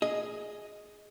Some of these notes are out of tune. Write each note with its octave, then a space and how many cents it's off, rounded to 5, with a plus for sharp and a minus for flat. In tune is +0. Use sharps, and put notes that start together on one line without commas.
G#4 +5 D#5 +0